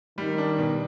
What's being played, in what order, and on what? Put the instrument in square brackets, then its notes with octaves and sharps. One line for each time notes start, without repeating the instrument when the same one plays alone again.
[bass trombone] D#3 [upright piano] G3
[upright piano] D4
B2